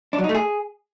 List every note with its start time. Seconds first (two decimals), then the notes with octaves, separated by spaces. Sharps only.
0.13 D4
0.18 F#3
0.24 D#4
0.29 A3
0.35 G#4